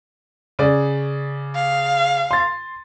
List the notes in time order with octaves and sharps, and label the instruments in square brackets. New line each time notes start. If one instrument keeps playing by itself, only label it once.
[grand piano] C#3 D5
[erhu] F5
[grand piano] C6 A6